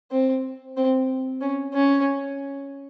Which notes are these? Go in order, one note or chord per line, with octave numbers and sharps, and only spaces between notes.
C4
C4
C#4
C#4